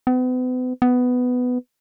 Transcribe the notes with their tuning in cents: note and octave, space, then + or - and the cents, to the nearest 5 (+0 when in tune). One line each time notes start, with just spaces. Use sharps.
B3 +40
B3 +10